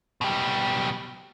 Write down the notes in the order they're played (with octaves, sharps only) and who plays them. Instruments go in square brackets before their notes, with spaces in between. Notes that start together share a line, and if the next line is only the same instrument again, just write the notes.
[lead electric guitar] B2 G3